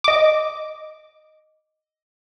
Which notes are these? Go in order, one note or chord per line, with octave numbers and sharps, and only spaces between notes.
D#5 D6